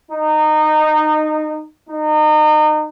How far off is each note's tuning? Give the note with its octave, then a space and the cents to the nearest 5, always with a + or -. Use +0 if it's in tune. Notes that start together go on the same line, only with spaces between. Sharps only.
D#4 -20
D#4 -30